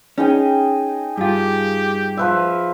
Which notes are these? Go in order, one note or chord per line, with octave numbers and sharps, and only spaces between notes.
C#4 D#4 G#4 G5
G2 F4 G4
F3 B4 E5